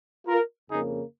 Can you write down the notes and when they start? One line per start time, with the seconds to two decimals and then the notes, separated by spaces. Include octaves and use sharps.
0.26 F4 A#4
0.70 F2 C#3 A#3 D#4 G#4